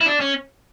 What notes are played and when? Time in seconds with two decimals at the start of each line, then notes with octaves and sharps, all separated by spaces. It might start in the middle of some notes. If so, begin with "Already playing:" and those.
0.01 E4
0.06 D4
0.20 C#4